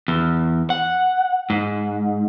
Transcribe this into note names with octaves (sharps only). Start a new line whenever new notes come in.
E2
F#5
G#2